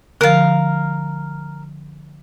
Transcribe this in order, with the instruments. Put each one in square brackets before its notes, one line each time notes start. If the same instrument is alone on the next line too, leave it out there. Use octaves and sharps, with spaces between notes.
[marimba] D3 F3 [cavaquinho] A#4 F5